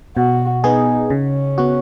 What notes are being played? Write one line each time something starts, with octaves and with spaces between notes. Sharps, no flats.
B2 F#4
B3 D#4 G#4
C#3 C#4
B3 F#4